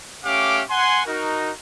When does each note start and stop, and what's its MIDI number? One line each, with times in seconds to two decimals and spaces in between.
0.25 0.62 57
0.25 0.62 61
0.25 0.62 67
0.25 0.62 76
0.25 0.62 77
0.25 0.62 86
0.70 1.01 78
0.70 1.01 80
0.70 1.01 84
1.07 1.51 63
1.07 1.51 66
1.07 1.51 70